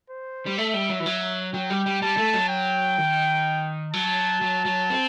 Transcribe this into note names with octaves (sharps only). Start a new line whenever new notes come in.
C5
G3
A3 E5
G3
F#3
E3
F#3
F#3 G5
G3
G3
G3 A5
A3
F#3
G5
D#3
F#3 A5
F#3
F#3
C4